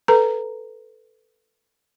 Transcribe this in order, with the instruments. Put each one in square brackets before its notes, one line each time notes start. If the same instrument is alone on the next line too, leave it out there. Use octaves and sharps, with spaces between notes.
[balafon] A4 B4 A#5